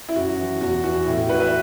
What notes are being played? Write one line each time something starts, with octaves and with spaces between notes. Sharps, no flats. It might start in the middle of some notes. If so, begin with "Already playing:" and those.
E4
F#2 F#4
E3
E2 F#4
E3 F#4
A2 E4
F#4
E3 F#4 B4
B4 E5